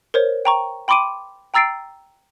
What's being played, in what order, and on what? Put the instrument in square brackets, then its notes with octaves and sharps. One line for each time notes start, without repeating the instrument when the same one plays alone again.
[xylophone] A#4 C5 C#5
G5 A#5 C#6
G5 B5 C6 D6 D7 D#7
G5 A#5 E6 A6 C7 D7